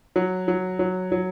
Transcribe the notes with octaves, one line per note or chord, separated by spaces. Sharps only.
F#3
F#3
F#3
F#3